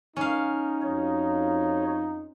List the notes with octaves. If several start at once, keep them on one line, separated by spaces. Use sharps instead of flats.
C#4 D#4 F5
F2 F4 F#4 C#5